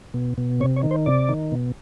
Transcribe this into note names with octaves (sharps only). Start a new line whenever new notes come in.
B2
B2
C3 C#5
C#5
D#3
C5
C3 D5
D#3
B2